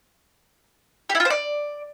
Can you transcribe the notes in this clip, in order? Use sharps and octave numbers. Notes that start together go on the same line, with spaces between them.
G4
E4
F4
C5
D5